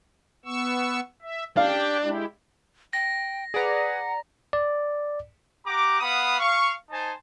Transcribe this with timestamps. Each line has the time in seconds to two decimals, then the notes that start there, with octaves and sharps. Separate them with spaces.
0.45 B3 C#6 E6
1.22 E5
1.57 D4 G4 F5 G5
2.03 G#3 E4 G4
2.93 G5 A#6
3.54 G#4 B4 D5 F#5 A#5
4.53 D5
5.66 G4 F#5 A#5 D6
6.00 B3 F5 F#5 B5 D#6
6.39 F5 C#6
6.91 D#4 C5 G#5 A5